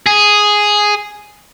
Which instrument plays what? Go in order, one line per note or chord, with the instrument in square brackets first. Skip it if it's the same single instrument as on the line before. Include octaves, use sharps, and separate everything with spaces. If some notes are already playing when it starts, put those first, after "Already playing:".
[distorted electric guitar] G#4